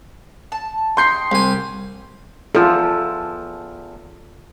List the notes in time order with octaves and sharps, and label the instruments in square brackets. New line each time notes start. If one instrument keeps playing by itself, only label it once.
[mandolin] A5
[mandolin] D#4 G4 G5 [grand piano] C6 G6 C7
[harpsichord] C2 G#5 [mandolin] G4
[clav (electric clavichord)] E2 F3 [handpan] F4 A4